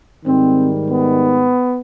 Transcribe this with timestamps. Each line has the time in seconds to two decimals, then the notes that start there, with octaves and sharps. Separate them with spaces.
0.25 G#2 D#3 G3 C4
0.90 B3